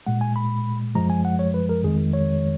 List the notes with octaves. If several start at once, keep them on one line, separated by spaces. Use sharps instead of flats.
A#2 G#3 F#5
G#5
B5
F#2 F3 G#3 A#5
G#5
F#5
C#5
B4
A#4
F2 D#3 G#3 G#4
C#5